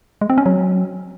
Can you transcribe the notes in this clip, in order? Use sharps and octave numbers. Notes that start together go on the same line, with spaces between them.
G#3
C4
C#4
F#3